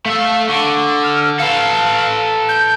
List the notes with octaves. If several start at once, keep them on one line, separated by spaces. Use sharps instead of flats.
A3 E5 F5
D3 C#6
F6
A4 B4 F5
G6